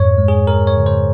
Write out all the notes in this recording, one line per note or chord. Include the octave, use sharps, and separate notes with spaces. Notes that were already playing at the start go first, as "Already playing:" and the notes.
Already playing: F2 G#2 C#5
G#3
G#4
F2 A#4
C#5
C#3
C5